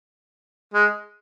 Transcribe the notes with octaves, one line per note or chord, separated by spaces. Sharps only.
G#3